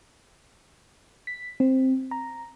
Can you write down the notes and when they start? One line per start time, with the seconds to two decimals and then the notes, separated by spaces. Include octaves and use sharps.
1.27 B6
1.60 C4
2.11 A#5